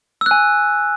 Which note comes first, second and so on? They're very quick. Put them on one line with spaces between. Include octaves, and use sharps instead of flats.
E6 F#6 G#5